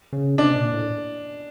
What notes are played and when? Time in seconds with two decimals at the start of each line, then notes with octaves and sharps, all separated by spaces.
0.13 C#3
0.38 C3 D4
0.56 A#2
0.73 A2